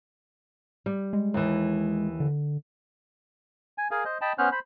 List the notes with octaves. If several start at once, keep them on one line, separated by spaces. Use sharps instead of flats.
G3
G#3
D#2 E3
D3
G#5
G#4 A#4 F5 G#5
C5 D#5
D#5 G5 A5 B5
B3 C#4 C5 F6 F#6
C5 B5